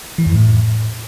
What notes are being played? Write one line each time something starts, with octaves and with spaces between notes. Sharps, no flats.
E3
F2
A2